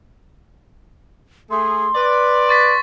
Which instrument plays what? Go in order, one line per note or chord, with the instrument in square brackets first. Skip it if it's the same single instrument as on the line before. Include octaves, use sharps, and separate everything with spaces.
[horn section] A3 G#4 [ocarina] C6
[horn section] B4 D5
[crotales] C#6 A6 B6